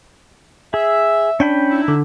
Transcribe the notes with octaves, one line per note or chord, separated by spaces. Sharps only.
G#4 E5
C#4 D4 G5 B5
D#4 E4
D3